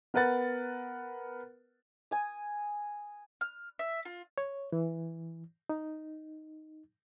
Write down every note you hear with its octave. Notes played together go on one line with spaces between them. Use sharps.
B3 A#4 B4 F#5 A6
G#5 D#6
F6
E5
F4
C#5
E3
D#4